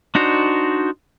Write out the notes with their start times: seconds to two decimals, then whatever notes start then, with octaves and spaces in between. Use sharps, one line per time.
0.15 D4 D#4 F#4 C5